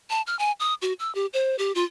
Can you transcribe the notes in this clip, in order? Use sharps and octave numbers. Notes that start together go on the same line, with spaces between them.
A5
F6
G#5
D#6
F#4
E6
G4
C5
G4
F4